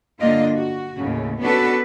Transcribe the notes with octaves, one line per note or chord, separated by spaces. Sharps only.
G2 D3 A#3 D4 F4 D#5
F#4
D#2 A2 C#3
B3 C#4 D4 F#4 A4 B4